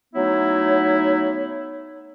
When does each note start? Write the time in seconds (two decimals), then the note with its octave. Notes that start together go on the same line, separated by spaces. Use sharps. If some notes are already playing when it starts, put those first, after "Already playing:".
0.14 F#3 A3 B3 D#4 E4 C#5